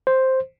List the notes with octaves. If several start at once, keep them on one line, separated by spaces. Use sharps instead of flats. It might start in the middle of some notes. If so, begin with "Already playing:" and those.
C5